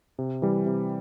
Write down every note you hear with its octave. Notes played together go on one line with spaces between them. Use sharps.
C3
E3 G3
C3